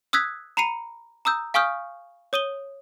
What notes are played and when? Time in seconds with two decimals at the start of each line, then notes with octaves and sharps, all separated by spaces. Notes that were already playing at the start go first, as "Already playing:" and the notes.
0.13 D#6 E6 F#6 G#6 B6
0.57 A#5 B5 C7 C#7 D#7
1.25 A#5 D#6 E6 G6
1.54 F5 G#5 C#6 D#6 F6 G6
2.33 C#5 D#6 D#7 G7